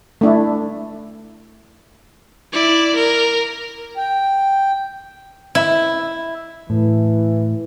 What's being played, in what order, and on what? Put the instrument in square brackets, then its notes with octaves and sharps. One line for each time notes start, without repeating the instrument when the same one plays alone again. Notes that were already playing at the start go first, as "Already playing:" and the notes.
[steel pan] A3 D4 E4
[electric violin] E4 D5
A#4
[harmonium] G5
[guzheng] E4
[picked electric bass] A2 [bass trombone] E3